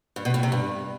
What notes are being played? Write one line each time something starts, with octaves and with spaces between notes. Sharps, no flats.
G2
B2
A2
C3
G2